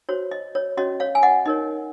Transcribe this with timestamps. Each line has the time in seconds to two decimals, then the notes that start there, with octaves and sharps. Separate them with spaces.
0.09 F#4 C5 C#5
0.31 D#5
0.55 C#5
0.77 C#4 F#4 C#5 D#5
1.00 C#5 F5
1.15 G#5
1.23 D#5 F#5
1.46 D#4 A#4 C#5 D#5